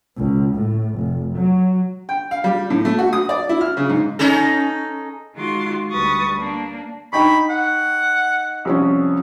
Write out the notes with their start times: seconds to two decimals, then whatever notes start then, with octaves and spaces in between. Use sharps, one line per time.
0.16 C#2
0.54 A2
0.95 F1
1.36 F#3
2.09 G5
2.31 F5
2.44 G3
2.70 A2
2.85 A3
2.99 F#4
3.13 D#6
3.29 D5
3.49 E4
3.61 F6
3.77 C#3
3.89 G#2
4.19 C#4 D#4 A4
5.35 D#3 G#3 F4 F#4 C6 D6
5.91 D2 G3 B4 C#6 D#6 A6
6.37 A#3 D4
7.13 D#4 G5 B5 C#6
7.50 F#5
8.65 C2 F3 C#4